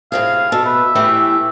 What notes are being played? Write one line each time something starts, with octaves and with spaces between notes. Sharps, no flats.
A2 C3 G#4 F5
B2 A4
B4 E5
A2 E3 A3 G4